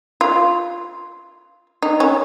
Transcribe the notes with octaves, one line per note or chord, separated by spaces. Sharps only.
F4
D#4
C#4